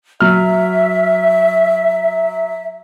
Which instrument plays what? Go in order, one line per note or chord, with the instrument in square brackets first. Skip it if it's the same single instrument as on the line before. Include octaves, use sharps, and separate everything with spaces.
[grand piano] F#3 F6 [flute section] E5